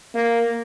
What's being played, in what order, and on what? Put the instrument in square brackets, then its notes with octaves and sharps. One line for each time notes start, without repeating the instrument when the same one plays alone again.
[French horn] A#3